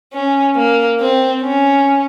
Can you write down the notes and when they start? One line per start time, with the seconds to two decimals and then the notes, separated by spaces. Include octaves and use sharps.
0.13 C#4
0.56 A#3
1.00 C4
1.43 C#4